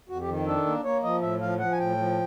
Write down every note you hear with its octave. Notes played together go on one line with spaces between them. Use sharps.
F2 F#4
G4
D#3
D4 A4
A#3
A#3 C#5
F3 D#5
A2 E5
F3 F5
F3 F#5
G#5
A2 G5
F3